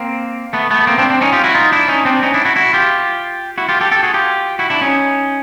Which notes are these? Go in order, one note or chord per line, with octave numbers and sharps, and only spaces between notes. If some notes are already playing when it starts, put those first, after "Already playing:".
Already playing: A#3 C4
A3 B3
A3 B3
A#3 C4
C4 D4
C4 D4
C#4 D#4
F4 G4
E4 F#4
D#4 F4
D4 E4
C#4 D#4
C4 D4
C#4 D#4
D4 E4
E4 F#4
E4 F#4
F4 G4
E4 F#4
F4 G4
G4 A4
G4 A4
F#4 G#4
F4 G4
E4 F#4
D4 E4
C#4 D#4